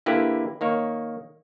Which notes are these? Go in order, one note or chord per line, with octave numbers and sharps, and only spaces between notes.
D3 A#3 E4 G4 B4
D#3 A#3 C#5